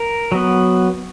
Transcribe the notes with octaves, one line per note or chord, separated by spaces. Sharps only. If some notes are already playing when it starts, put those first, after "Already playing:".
Already playing: A#4
F#3 B3